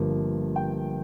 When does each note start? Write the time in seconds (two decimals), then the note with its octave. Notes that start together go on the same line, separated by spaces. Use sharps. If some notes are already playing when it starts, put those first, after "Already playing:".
Already playing: G1 G2 F3 A#3
0.56 G5